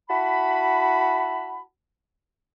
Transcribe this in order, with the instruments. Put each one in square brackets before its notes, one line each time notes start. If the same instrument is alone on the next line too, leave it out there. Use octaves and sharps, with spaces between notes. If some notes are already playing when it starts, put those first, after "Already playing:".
[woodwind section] E4 F#4 A5 B5